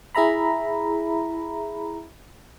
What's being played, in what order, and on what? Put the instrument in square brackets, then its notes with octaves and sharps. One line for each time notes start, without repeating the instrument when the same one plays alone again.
[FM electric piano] E4 G#4 E5 A#5 B5